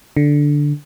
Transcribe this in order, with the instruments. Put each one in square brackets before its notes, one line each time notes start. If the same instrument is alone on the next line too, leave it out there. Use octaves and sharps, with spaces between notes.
[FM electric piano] D3